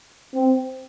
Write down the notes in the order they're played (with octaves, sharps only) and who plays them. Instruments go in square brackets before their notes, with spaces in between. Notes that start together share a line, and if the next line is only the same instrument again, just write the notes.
[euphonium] C4